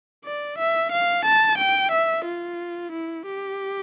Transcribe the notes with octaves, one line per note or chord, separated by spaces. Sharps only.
D5
E5
F5
A5
G5
E5
F4
E4
G4